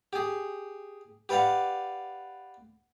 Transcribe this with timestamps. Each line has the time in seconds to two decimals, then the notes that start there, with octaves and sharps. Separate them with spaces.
0.13 G4 G#4
1.29 G4 B4 D5 F5 F#5